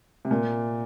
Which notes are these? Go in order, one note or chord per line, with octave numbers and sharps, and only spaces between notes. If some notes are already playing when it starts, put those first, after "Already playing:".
C3
A#2